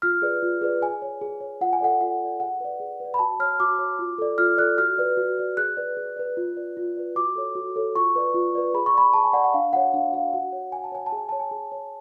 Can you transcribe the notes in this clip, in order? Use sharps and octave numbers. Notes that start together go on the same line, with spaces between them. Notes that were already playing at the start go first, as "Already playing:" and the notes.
F4 F6
G#4 B4 D5
F4
G#4 B4 D5
G#4 G#5
C#5
G#4
C#5
F4 F#5
G#5
A4 D5 F#5
F4 F#5
A4 D5
G#4 F#5
B4 D5
G#4
B4 D5
B5
F#4 A5
C#5 F6
F#4 D6
C#5
F4
A4 D5
F4 F6
A4 D5 F#6
F#4 F6
B4 D5
F#4
B4 D5
G#4 F#6
B4 D5
G#4
B4 D5
F4
B4 D5
F4
B4 D5
F#4 D6
A4 C#5
F#4
A4 C#5
F4 C#6
B4 D5
F4
B4 D5
G#4 B5
C#6
D5 B5
G#4 A5
G#5
D5 F#5
F#5
D4 F5
F#4 C#5 F#5
D4 F5
F#4 C#5 F5
F#4 F#5
C#5
F#4 G#5
A5
C#5 G#5
A5
G#4
G#5
C#5 A5
G#5
G#4
C#5